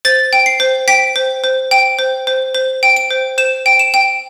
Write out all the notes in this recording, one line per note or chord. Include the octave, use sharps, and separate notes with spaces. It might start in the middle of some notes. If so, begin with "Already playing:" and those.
C5 A6
G5
C7
C5
G5 B6
C5
C5
G5
C5
C5
C5
G5
D7
C5
C5 E7
G5
E7
G5